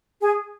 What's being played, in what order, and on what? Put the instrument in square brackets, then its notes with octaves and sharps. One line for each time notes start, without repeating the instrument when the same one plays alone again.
[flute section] G#4 G#5